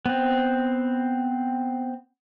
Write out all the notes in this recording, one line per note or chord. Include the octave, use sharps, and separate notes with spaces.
B3 C4